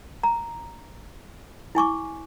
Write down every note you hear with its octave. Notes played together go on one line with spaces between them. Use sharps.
A#5
E4 G#5 C#6 D6